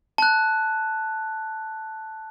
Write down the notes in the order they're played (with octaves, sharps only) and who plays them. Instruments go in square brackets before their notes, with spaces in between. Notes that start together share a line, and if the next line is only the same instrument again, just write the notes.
[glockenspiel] A5 F#6